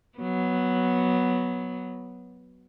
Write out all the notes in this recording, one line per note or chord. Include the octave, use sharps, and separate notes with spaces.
F#3 B3